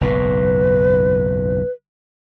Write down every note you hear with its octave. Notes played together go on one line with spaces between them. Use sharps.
F#1 B1 G#2 B4